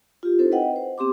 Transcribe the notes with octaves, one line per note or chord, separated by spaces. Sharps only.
F4 G4
C4 D#4 E4 A4 C5
B4 D#5 F#5 G5
C5
B3 C4 G4 C6 D6